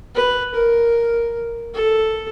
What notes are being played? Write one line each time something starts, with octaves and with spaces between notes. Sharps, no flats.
B4
A#4
A4